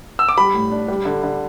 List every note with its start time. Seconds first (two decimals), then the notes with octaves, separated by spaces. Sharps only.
0.19 E6
0.29 D6
0.37 G3 B5
0.54 A2
0.71 D4
0.88 G3
1.05 D3
1.23 D3